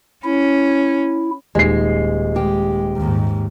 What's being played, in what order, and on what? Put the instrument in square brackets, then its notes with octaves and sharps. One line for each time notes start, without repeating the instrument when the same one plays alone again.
[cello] C#4 [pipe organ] E4
[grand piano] D#1 D#4 C7 [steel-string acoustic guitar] G#3
[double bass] G#3 [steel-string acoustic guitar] G4
[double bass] D#2 G#2